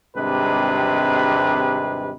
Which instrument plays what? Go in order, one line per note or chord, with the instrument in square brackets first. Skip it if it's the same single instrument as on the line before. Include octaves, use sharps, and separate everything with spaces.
[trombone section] G#1 C3 G3 G#3 D4 B4